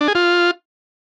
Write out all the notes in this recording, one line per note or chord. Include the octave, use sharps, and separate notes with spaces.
D4
G#4
F4